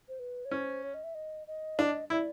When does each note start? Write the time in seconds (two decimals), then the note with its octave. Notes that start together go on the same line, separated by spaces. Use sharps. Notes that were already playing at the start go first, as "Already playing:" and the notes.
0.09 C5
0.20 B4
0.45 C#5
0.51 C#4 C5
0.83 C#5
0.94 D#5
1.04 E5
1.15 D#5
1.47 D#5
1.79 D4
2.10 E4 D5